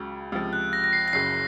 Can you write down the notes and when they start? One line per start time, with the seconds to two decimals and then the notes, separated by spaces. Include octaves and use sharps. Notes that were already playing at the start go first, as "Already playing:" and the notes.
Already playing: C#2 C#3 F#3
0.32 C#2 C3 F3
0.53 F#6
0.73 A#6
0.84 A#6
0.93 C7
1.08 A#6
1.13 F#1 F#2 C#3 C7